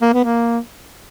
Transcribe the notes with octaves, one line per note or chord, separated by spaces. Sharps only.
A#3
B3
A#3